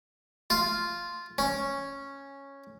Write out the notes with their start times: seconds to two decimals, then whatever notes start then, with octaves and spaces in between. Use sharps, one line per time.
0.50 F4
1.38 C#4